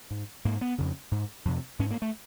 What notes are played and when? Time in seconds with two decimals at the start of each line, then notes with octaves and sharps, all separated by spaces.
0.11 G#2
0.45 G#2 A#3
0.61 B3
0.78 F2 C#3
1.11 G#2
1.45 F2 C3
1.79 G#2 C#4
1.91 A#3
2.02 A3